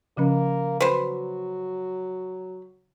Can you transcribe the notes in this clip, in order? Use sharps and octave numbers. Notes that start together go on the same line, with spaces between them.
C#3 F3 A#3 C#4
F#3 B4 C5